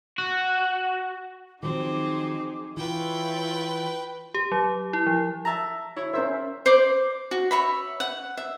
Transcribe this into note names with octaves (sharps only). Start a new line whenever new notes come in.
F#4
D#3 F3 F#3 C4 D#4 G#4 D6
E3 E4 F4 B4 C#5 G5
G4
F#3
E4
F3
E5 A5 A#5
E4 C#5
C#4 A#4 C5 E5
C5 D5 D6
F#4
C#5 E5 B5
F#5
E5